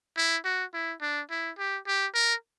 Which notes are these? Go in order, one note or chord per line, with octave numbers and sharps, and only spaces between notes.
E4
F#4
E4
D4
E4
G4
G4
A#4